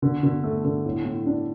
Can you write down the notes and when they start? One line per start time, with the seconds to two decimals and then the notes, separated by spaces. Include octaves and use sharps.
0.02 D3
0.23 D3
0.44 A3
0.64 D3
0.85 A2
1.05 A2
1.26 D4